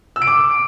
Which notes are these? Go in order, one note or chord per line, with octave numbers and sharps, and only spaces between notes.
E6
D7
D6